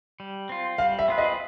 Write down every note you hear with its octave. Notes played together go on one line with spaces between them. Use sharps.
G3
C4 F4
G3 F5
E5
C4 F4 G#4 B4
D#5